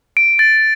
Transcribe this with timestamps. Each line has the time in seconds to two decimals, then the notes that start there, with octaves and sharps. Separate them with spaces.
0.17 D7
0.39 A6